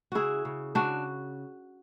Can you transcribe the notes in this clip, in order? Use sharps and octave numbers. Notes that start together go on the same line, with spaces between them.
C#3 E4 F#4 G#4
C#3
C#3 D4 F#4